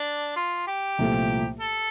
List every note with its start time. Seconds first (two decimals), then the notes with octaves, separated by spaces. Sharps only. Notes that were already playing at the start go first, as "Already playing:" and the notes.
Already playing: D4
0.36 F4
0.67 G4
0.98 C2 A#2 F3 A3
1.59 A4